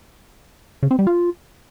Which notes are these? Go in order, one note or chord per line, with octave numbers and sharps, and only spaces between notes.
C#3
C4
G3
F4